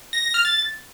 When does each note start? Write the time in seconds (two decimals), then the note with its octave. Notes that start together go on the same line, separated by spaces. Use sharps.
0.13 A#6
0.24 A#6
0.34 F6
0.45 A6